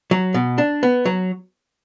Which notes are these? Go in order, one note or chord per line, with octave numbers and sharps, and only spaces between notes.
F#3
B2
D4
B3
F#3